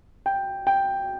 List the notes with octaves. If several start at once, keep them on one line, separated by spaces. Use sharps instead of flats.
G5
G5